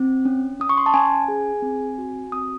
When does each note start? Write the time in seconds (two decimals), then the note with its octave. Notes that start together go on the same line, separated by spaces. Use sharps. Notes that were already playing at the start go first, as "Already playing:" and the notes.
Already playing: C4
0.25 C#4
0.60 C#4 D#6
0.69 C#6
0.78 C6
0.86 A5
0.94 C#4 G#5
1.28 G#4
1.62 C4
1.98 F#4
2.32 C4 D#6